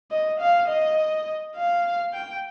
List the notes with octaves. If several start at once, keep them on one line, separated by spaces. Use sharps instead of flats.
D#5
F5
D#5
F5
G5